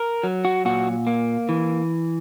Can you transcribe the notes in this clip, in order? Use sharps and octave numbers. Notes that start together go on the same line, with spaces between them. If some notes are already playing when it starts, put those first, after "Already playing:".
Already playing: A#4
F#3
F#4
A#2 F#4
A#3
E3